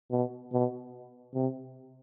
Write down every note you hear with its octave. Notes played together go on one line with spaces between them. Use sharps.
B2
B2
C3